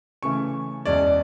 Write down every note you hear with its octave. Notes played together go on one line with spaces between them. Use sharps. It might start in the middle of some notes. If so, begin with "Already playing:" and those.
C#3 E3 A3 C#4 C#6
E2 B2 G#3 C#4 D5